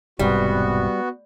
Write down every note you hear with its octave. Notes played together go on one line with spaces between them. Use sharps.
E1 G#2 C3 G3 B3 F#4